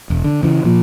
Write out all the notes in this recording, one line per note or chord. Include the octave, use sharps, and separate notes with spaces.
E1
D3
C#3 E3
A#2 F3